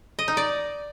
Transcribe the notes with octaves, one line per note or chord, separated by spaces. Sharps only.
D#5
D#4
D5